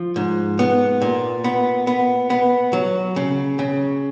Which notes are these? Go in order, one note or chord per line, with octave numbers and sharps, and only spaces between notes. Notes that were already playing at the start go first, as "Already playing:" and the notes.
Already playing: F3
G#2
B3
A#2
B3
B3
B3
F#3
C#3
C#3